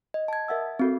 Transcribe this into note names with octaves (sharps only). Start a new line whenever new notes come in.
D#5
A5 G#6
A#4 E5 F#5 E6
C4 F#4 A4